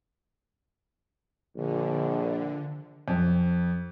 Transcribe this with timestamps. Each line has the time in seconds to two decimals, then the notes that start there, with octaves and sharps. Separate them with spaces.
1.56 A#1 D3
3.08 F2